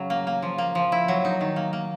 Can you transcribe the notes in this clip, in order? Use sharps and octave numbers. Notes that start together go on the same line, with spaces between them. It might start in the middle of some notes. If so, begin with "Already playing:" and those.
Already playing: C#3 F#3 C#4
A#3
A#3
F3
A#3
F3
E4
F#3
D#4
D#3
A#3
A#3